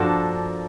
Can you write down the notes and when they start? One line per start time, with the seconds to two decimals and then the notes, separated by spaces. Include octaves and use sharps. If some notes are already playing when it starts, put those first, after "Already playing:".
Already playing: G2 F3 A#3 D4 F#4 A4
0.35 G2